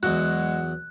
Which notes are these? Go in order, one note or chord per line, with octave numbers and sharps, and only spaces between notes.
E2 F#3 G#3 F#4 F#6